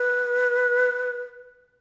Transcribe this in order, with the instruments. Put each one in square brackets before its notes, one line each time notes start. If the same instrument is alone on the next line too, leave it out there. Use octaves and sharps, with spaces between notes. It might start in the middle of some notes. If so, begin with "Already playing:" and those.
Already playing: [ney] B4